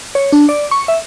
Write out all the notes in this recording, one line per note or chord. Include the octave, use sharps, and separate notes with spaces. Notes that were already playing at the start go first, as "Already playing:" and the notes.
C#5
D4
D5
C#6
E5